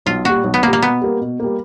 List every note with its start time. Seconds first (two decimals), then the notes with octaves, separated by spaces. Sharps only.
0.06 B1 F4
0.25 A#2 G3 F#4
0.44 B1
0.54 B3
0.63 A#2 A#3
0.68 G3
0.73 A#3
0.82 B2 B3
1.01 G3 A#3
1.21 B2
1.40 G3 A#3